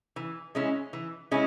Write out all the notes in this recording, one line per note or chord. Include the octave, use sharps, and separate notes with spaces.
E3
G#3 C#4 E4
E3
G#3 C#4 E4